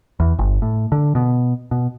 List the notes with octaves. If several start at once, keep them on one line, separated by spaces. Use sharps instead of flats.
E2
G1
A2
D3
B2
B2